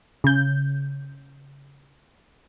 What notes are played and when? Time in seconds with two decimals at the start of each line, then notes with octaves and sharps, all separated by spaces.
0.24 C#3 G6